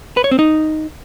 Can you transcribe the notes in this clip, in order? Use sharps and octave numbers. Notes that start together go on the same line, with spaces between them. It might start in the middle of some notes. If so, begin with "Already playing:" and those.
B4
C#5
C4
D#4